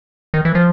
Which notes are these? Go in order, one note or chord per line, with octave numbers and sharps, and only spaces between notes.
D#3
E3
F3